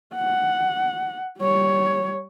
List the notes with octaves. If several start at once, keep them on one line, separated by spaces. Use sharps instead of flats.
F#5
G3 C#5